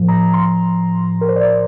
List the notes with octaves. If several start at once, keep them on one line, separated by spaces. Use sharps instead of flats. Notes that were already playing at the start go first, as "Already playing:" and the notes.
Already playing: A2 F3
A#5
C6
A#4
C5
D5